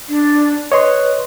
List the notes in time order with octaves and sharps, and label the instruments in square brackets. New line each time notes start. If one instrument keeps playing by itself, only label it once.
[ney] D4
[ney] B4 [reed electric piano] C#5 D#5 C6